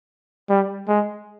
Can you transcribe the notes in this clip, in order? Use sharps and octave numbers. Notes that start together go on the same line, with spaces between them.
G3
G#3